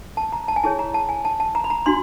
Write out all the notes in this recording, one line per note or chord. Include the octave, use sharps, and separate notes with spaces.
A5
A#5
A5
G#5
E4 G#4 C#5 A5
A#5
A5
G#5
A5
A5
A#5
B5
A#5
D4 F#4 C6